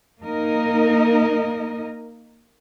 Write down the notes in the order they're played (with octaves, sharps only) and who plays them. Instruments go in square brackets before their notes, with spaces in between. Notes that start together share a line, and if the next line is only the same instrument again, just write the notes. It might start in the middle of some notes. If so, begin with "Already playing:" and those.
[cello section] A#3 D#4 A#4 D#5